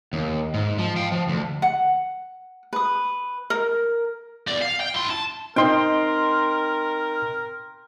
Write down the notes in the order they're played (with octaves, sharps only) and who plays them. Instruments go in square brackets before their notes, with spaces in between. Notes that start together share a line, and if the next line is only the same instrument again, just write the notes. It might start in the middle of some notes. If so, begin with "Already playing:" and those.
[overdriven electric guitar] D#2
G#2
F3
F5 G5
F3
D2
[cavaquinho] F#5
B4 D#6
A#4
[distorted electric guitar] E2 D5
F5
G5
E4 C6
A5
[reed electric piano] C4 D#4 D#5 [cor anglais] A#4 [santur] G5 C6